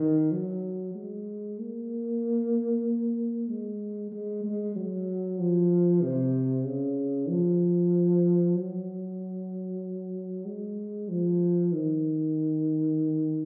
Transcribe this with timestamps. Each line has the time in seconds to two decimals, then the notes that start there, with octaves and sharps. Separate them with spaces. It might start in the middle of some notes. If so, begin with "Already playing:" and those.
Already playing: D#3
0.32 F#3
0.95 G#3
1.59 A#3
3.49 G#3
4.12 G#3
4.44 G#3
4.76 F#3
5.39 F3
6.02 C3
6.65 C#3
7.28 F3
8.56 F#3
10.46 G#3
11.09 F3
11.73 D#3